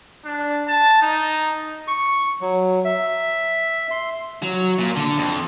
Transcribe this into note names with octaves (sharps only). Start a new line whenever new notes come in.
D4
A5
D#4
C#6
F#3
E5
C6
F#3
A#2
D3
F2